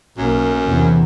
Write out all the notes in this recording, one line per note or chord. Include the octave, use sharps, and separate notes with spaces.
B1 F#2 A#3
E2 C3 E3